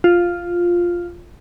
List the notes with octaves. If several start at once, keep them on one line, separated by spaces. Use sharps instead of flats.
F4